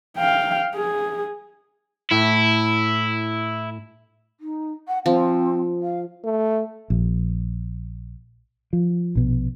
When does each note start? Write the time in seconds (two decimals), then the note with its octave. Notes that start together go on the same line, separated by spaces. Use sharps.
0.18 F5 G5
0.75 G#4
2.11 A2 E4
4.40 D#4
4.88 F#5
5.06 F3 C4
5.82 F5
6.24 A3
6.90 A#1
8.73 F3
9.15 A#1 B2